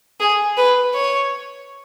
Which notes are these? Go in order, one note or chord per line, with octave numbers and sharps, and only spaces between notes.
G#4
B4
C#5